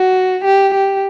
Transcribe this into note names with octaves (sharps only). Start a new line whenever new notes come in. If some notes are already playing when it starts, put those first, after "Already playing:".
Already playing: F#4
G4
G4